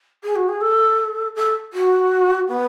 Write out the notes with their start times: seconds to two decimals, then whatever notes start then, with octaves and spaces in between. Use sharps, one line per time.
0.23 G#4
0.35 F#4
0.48 G#4
0.61 A4
1.36 A4
1.73 F#4
2.48 B3